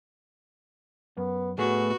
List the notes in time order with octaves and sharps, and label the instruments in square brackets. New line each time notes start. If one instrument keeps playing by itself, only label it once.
[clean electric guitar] F#2 [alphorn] B3
[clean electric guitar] A2 A3 G#4 [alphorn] B3 [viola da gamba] F#4